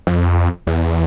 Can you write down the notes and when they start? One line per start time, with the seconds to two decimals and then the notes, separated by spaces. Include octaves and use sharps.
0.07 F2
0.67 E2